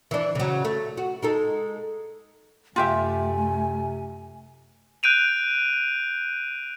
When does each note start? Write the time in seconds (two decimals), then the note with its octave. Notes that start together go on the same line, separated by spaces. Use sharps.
0.11 E3 D4
0.35 C#3 F#3
0.65 A3
0.97 F#4
1.22 G#3 D#4 A4
2.76 F#2 C3 A3 F4 G4 E5 G#5
5.03 F#6 G6 D7 D#7 F7